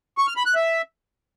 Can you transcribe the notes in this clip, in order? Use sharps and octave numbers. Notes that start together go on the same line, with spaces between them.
C#6
F6
B5
F#6
E5